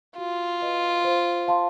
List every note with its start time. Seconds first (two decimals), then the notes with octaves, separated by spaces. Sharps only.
0.18 F4 F#4
0.62 B4 D#5
1.04 C5
1.48 F5 A5 C6